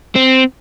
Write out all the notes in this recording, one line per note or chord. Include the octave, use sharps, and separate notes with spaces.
C4